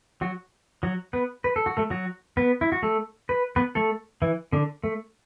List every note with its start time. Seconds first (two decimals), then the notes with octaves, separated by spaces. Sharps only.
0.21 F#3 F#4
0.83 F#3 F#4
1.13 B3 B4
1.44 B4
1.56 A4
1.66 F#4
1.77 A3 A4
1.90 F#3 F#4
2.37 B3 B4
2.61 E4
2.72 F#4
2.83 A3 A4
3.29 B4
3.56 B3 B4
3.75 A3 A4
4.22 E3 E4
4.52 D3 D4
4.84 A3